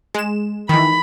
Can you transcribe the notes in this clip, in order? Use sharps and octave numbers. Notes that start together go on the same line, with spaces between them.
G#3 E7
D#3 E3 B5